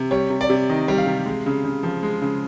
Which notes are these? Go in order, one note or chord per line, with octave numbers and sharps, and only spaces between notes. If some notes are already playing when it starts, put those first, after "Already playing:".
Already playing: C3
G3 C#5
C3
D5
C3
D#3 D#5
G3
F5
C3
G#3
C#3
C#3
F3
G#3
C#3